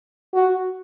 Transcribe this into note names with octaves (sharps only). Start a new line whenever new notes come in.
F#4